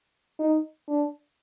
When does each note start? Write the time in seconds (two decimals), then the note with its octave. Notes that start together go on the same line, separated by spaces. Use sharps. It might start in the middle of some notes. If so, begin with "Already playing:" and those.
0.39 D#4
0.88 D4